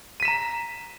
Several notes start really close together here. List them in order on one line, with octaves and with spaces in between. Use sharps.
D#7 B6 E7 A#5